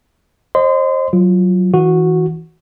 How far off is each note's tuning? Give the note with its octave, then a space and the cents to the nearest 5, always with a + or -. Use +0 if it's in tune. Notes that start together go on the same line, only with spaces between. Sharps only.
C5 +30 D#5 -20 C6 -30
F#3 +0 F4 +0
E3 -30 F#4 -10